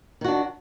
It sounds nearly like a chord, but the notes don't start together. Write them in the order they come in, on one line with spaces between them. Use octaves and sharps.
D#3 F#4 D4